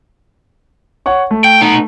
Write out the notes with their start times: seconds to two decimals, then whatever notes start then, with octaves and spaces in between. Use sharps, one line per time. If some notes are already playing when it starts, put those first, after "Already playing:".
1.06 C#5 F#5 C#6
1.31 A3
1.44 G5
1.61 B3 D#4